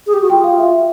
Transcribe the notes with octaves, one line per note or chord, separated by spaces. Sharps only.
G#4
G4
F#4
F4 G5
F5
E5